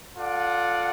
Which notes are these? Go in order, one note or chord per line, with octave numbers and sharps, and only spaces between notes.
F4 A4 D5 F#5